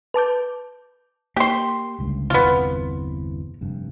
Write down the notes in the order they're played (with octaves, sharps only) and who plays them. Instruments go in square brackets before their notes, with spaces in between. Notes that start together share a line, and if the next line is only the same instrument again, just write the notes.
[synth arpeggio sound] B4 A5 D6 G6
[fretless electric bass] A#3 [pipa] G4 C6
[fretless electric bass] G1 C#2 G2
[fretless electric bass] G1 E2 C3 [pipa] B3 F4
[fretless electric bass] F1 G2